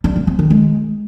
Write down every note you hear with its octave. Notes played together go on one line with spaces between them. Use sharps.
G3
A#3
C4
D#3
G#3